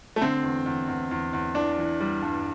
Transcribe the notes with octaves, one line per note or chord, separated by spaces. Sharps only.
A3
D3 C4
E2
E2
E2
E2
E2
E3 D4
E3
G3
G2